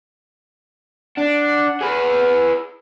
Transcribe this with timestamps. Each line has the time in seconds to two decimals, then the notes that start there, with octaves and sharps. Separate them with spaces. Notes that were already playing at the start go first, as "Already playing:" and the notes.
1.18 D4 F#5
1.81 G#4 B4